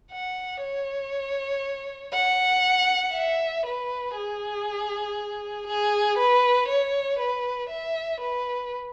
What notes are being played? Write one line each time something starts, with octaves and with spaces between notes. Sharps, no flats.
F#5
C#5
F#5
E5
B4
G#4
G#4
B4
C#5
B4
E5
B4